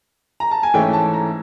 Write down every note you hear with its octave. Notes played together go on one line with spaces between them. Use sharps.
A#5
A5
G#5
G#2 E3 A3 C#4 G5
A5
A#5